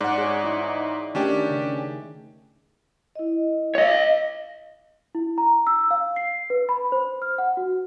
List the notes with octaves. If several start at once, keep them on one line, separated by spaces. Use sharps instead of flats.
G#2 D5 F#5
G#4 C#5
D#4 E4
D#3 A3 C#4 D4 G4
C#3
E4 D#5
C#5 D#5
E4
A#5
E6
F5
C7
B4
B5
C5
F6
F#5
F#4